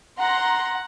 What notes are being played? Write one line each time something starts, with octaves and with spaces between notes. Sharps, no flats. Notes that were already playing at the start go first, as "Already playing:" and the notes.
F#5 A#5 C6